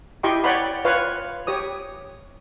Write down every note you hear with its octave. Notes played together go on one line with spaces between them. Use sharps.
E4 G4 D#5 G5 C6 C#6
C#5 D5 F#5 G5 B5 C6
F4 B4 C#5 F5
G4 C#5 D#6